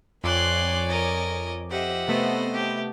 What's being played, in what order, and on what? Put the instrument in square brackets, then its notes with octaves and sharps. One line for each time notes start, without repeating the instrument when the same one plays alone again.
[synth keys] F2 D6 [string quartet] C#5 D5 G#5 [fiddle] C6 F#6
[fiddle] A#4 D#5
[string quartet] G4 C5 D#5 [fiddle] E5 F#5
[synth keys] C3 A3 B3 [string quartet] C5 D#5
[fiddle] G4